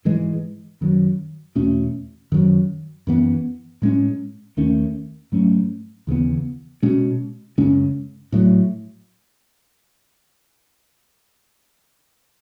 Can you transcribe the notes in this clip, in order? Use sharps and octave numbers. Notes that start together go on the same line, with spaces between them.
G#2 E3 G#3
F#2 D#3 F#3
E2 B2 A3 C#4
F#2 D#3 F#3
F#2 E3 B3
A2 G#3 C#4
D#2 D#3 A3 C#4
G#2 F#3 A3 C#4
D#2 C#3 E3 B3
B2 G#3 C#4
F#2 C#3 G#3 C#4
A2 F#3 A3